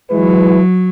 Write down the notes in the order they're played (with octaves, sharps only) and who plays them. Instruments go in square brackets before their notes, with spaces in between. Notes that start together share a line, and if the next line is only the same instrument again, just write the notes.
[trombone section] E3 G#3 E4 B4 [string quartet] F#3